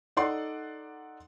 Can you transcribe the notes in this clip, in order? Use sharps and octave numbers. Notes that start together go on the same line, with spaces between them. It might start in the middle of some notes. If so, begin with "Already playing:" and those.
D#4 A4 D5 F#5 C6